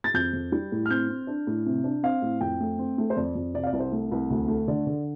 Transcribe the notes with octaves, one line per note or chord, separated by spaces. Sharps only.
A6
F2 G6
F2
G3
A2
F6
C4 G6
C4
D4
A2
C3
D4
C4 F5
A2
F2 G5
A3
C4
A3
C5
F2 D5
F2
C3 D5
F5
D5
C2
C5
A3
C2
D2
A3
D3 D5
D3